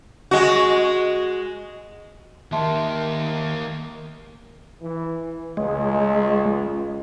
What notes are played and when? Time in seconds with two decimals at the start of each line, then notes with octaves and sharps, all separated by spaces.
0.31 G#3 F#4
2.52 D#3 A#3 G4 E5 A5 C6
4.82 E3
5.57 C#2 G#3